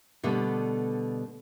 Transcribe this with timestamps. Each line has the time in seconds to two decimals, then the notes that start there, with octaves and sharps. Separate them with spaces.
0.23 B2 D3 G3 A3 B3